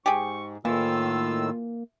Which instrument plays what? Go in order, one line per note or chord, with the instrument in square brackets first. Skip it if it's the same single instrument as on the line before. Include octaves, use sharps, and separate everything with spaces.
[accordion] G#2 [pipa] G4 G#4 [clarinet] C#6
[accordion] A2 D#3 E6 [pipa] E3 [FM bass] A#3 [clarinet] F4